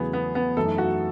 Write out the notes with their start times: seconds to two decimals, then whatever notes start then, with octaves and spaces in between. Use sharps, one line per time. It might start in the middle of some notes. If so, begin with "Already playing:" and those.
Already playing: E2 C#3 F#3 A3 B3 E4 G#4
0.13 B3
0.35 B3
0.57 F#2 E3 A3 D#4 A4
0.78 F#4